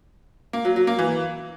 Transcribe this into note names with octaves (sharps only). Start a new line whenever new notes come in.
A#3
F#3
F#3
A#3
E3